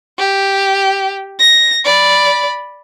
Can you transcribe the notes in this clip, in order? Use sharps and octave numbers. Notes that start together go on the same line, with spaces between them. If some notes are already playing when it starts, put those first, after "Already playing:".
G4
A#6
D5 B5